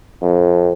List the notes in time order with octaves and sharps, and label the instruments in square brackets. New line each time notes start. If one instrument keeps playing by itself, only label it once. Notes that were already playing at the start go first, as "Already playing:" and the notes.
[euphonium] F2